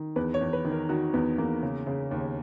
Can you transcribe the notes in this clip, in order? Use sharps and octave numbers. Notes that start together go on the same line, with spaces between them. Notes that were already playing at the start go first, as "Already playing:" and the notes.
Already playing: D#3
E2 B4
C#5
E2
B4
D#3
A#4
D#3 F#4
E2 B3
E2 A#3
C#3
C#3
D#2